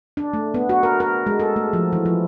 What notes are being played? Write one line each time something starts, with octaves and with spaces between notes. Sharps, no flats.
D4
A3
B3
F#4
A#4
A#4
G#3
A4
A3
F3
E3
F3